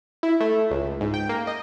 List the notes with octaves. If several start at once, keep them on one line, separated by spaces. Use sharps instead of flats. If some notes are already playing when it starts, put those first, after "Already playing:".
E4
A3
C#2
G#2
G5
A#3
D#5